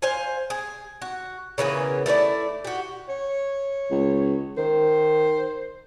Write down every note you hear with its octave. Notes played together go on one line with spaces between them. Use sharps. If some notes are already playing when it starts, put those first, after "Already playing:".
C5 F5 G#5
G#4
F#4
C#3 E3 A#3 B3
A3 E4 C#5 D5
F#4 G4
C#5
C#2
D#3 C5